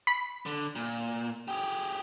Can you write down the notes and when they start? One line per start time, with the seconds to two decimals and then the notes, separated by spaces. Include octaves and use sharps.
0.07 B5
0.46 D3
0.76 A#2
1.48 G4 G#4